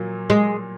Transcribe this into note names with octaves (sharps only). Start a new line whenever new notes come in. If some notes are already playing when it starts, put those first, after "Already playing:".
Already playing: A#2 F#3 A#3
G#3